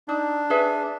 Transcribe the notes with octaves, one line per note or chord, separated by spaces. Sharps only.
D4 D#4
G#4 B4 E5